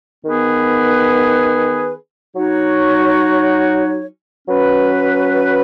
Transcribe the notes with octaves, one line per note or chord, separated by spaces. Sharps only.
D#3 B3 G#4 B4
F#3 D#4 F#4 C#5
F#3 C#4 B4